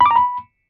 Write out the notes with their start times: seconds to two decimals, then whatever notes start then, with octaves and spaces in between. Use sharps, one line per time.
0.01 B5
0.06 D6
0.11 A#5
0.16 B5